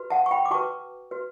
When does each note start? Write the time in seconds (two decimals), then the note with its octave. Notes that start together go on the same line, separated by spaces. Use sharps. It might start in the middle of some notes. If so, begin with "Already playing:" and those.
Already playing: F#4 B4
0.10 F#5 A5
0.26 C#6
0.31 G5 B5
0.45 D6
0.51 F#4 B4 A5 C#6
1.11 F#4 B4